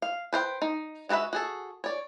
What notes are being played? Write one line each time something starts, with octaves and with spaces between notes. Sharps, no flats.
F5
B4 C5 F5 G5
D#4
G#3 F#4 A4 B4 E5
F#4 G#4 A4
C#5 D5